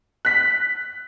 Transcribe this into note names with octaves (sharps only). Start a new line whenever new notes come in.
F#6 B6